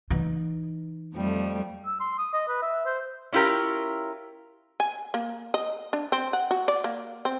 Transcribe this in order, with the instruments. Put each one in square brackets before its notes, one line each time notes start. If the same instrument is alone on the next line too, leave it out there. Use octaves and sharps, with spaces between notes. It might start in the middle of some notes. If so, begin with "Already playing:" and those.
[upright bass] E3 D#4
[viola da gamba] F2 G3 A3
[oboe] E6
C6
D#6
D#5
B4
E5
C5
[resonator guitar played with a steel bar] C#4 E4 F4 G4 A#4
[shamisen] G#5
A#3
D#5
D4
C4
F#5
F#4
D5
A#3
C4